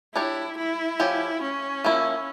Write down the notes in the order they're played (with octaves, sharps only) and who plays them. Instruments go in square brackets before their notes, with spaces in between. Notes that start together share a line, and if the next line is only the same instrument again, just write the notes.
[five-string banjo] D4 G4 C#5 [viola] E4
[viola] E4
[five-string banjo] F3 C#4 G4
[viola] C#4
[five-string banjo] F3 A#3 E4